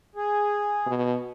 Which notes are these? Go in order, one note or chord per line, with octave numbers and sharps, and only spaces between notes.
G#4
B2